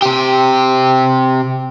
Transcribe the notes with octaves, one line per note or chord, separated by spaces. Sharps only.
C3 G4